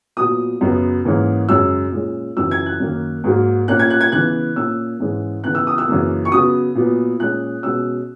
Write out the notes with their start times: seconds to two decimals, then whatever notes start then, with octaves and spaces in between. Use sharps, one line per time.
0.17 A#2 F#3 B3 D#6
0.61 F#2 C#3 F#3 B3
1.05 G#2 E3 A#3 C#4
1.49 F#2 C#3 G#3 C#4 E6
1.92 A#2 G#3 C#4
2.37 F#2 C#3 E3 E6
2.51 G#6
2.66 F#6
2.80 F#2 D#3 A#3
3.24 G#2 F#3 A#3
3.68 A#2 A#3 C#4 F#6
3.79 G#6
3.90 F#6
4.01 G#6
4.12 C#3 E3 B3 F#6
4.56 A#2 A#3 C#4 E6
5.00 G#2 E3 G#3 C#4
5.44 C#3 E3 B3 F#6
5.55 E6
5.67 D#6
5.78 E6
5.88 F#2 C#3 E3 A#3
6.25 C#6
6.32 C#3 F#3 B3 D#6
6.75 A#2 F#3 B3
7.19 A#2 G#3 C#4 F#6
7.63 B2 G#3 C#4 E6